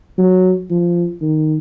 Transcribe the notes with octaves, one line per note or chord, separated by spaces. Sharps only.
F#3
F3
D#3